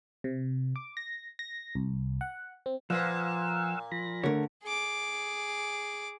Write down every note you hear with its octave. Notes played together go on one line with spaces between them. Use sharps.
C3
D6
A#6
A#6
C2
F#5
C4
A#2 F3 B4 C5 F5 F#5 E6
F3 B5 A#6
D3 A3 A#4 C#5
G#4 D6